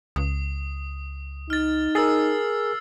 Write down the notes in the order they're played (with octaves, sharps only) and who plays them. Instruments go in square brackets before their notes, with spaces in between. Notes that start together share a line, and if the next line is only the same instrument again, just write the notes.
[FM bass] C#2 [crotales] D#6
[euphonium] D#4 [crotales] F6 A6
[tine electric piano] G#4 A#4 [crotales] E6 A6 C7